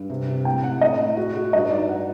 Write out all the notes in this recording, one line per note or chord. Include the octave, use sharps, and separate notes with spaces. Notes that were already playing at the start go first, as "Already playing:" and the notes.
Already playing: G2
C3
C3
A2 G5
A2 F#5
A2 D#5
A2
F#4
F#4
G2 D#5
D#4 D5
F#5